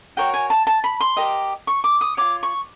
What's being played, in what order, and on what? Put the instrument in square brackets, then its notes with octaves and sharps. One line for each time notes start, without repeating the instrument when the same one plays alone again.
[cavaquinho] F#4 A#4 C#5 G5
G#5
A5
A5
B5
C6
G4 A#4 D#5
C#6
D6
D#6
F4 G#4 C#5 D6
C#6